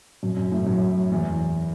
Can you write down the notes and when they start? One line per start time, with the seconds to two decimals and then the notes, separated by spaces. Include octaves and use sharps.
0.23 F#2
0.37 F#2
0.52 A2
0.67 F#2
1.12 E2